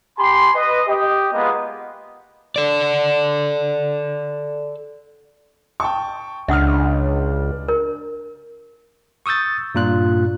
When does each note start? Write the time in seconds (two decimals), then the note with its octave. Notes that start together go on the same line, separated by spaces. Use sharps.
0.17 G4 G#5 B5 C6
0.53 B4 D#5
0.86 G4 D#5
1.32 G#3 A#3 B3 F4 D#5
2.56 A4 D5
5.80 G5 A5 C#6
6.48 C#2 D4 E5 F#5 D#6 F6
7.68 A#4
9.26 C#6 D#6 E6 G6 A6
9.75 G2 A#2 F4 F#6